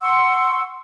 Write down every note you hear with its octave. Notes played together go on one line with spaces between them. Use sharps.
F#5 C6 C#6 E6